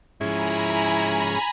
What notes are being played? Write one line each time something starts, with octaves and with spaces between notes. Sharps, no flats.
G#2 F3 C#4 E4 G#4 G#5 A#5 B5